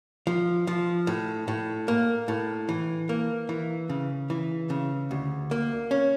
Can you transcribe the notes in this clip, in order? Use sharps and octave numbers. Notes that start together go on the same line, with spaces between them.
F3
F3
A2
A2
A#3
A2
E3
A#3
E3
C#3
E3
C#3
D2
A#3
C#4